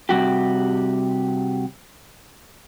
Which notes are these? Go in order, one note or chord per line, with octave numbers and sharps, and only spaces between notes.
C3 G3 F#4 G4